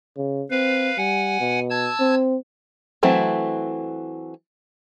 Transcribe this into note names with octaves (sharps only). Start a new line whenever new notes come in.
C#3
C4 B4 F5
G3 F#5 G#5
B2
A5 E6 G#6
C4
E3 F#3 A3 C4 E4